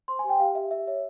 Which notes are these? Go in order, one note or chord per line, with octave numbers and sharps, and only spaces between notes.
C5 C6
G4 G#5
G5
G4 F5
G4 E5
G4 E5
C#5 E5